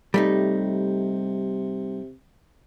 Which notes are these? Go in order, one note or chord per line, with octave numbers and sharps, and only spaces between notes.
C3 G3 A3 D#4